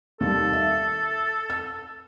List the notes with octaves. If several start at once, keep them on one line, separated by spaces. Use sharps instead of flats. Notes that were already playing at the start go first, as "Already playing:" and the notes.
D#2 G3 A4
E5
E6